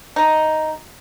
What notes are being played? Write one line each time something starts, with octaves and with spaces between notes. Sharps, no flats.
D#4